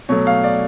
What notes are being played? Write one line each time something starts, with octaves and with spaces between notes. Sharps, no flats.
B2 F#3 A3 C#5
F5
D5